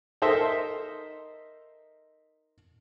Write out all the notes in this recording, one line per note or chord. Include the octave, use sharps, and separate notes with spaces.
D#4 A4 A#4 C5 D#5 E5